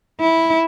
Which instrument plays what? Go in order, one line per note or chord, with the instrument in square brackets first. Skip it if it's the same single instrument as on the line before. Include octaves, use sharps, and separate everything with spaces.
[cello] E4